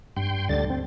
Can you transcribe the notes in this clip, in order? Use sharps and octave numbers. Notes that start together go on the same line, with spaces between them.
G2 G5 C6
D2 D3 G3 A6
C4